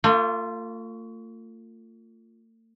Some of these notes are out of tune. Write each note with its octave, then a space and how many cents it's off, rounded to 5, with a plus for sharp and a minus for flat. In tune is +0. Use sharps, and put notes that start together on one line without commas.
A3 +45 F4 +0